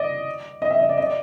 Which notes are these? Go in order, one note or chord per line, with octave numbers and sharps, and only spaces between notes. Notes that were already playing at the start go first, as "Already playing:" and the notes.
Already playing: D5 D#5
D#5
E5
D#5
D5
D#5
D5